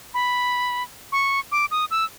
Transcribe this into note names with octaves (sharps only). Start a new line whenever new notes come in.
B5
C#6
D6
D#6
E6